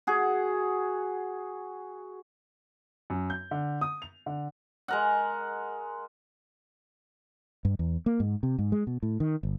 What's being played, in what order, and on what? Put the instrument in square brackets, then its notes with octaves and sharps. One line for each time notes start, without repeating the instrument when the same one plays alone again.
[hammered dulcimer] F#4 G#4
[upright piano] F#2
G6
D3
D#6
F7
D3
[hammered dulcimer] G#3 A#4 F#5
[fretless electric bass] G2
E2
A#3
G#2
C3
G#2
G#3
B2
A2
D#3
G1